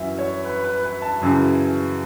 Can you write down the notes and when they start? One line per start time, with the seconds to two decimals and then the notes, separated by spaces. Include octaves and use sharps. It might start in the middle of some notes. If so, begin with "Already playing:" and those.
Already playing: F#2 E3 E5
0.19 C#5
0.44 B4
0.64 B4
0.83 B4
1.02 A5
1.21 F#2 C#3 E3